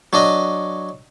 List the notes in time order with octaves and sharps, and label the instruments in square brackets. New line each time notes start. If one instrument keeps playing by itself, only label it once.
[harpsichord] F#3 D4 D#5